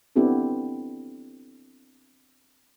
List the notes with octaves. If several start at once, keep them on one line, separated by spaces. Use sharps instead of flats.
B3 C4 D4 E4 G4 A4